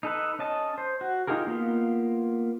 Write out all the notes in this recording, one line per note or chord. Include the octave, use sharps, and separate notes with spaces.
D#4 A4 B4
C#4 D#5 A5
C5
F#4
D#4 F4 G4 G#4 A#4
A#3 B3 F4